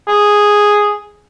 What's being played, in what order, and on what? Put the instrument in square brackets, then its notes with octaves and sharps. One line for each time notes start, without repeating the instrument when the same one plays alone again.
[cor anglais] G#4